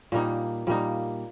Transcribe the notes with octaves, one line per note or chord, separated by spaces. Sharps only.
A#2 G3 A#3 D#4
A#2 G3 A#3 D#4